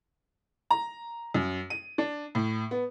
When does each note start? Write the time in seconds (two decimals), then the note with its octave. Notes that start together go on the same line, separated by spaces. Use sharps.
0.71 A#5
1.34 F#2
1.70 D#7
1.98 D4
2.35 A2
2.71 B3